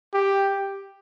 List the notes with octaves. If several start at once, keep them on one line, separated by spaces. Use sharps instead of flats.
G4